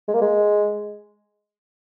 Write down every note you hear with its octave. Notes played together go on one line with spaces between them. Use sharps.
G#3
A#3
G#3